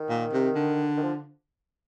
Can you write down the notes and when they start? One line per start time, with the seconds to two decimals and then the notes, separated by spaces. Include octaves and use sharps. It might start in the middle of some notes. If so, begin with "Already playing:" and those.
Already playing: D#3
0.09 A#2
0.33 C3
0.55 D3
0.97 D#3
1.03 F3